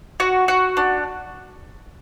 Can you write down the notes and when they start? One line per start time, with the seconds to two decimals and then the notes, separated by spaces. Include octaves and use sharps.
0.20 F#4
0.48 F#4
0.77 D4